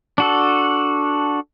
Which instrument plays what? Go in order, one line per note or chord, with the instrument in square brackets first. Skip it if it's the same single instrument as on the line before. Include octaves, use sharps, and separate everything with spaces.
[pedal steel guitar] D4 F#4 A4